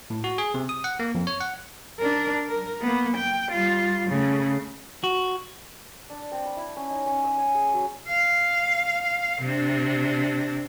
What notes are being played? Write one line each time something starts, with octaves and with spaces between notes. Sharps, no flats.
A2
F#4
G#4
C3
D#6
F#5
A#3
F2
C#5
F#5
D4 A#4
A#4
A#3 B3
G5
G3 F4
C#3 A3
F#4
D4
C4
B5
E4
C#4
D#4
C#4
E6
G#5
G#4
F#3
F5
C3 D4